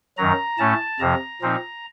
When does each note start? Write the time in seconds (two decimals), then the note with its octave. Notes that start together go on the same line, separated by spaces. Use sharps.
0.18 F#2 D#3 F#3 A#5
0.59 A2 A3 C#4 A5
1.00 F2 C3 F3 A#5
1.41 A#2 F3 C4 D#4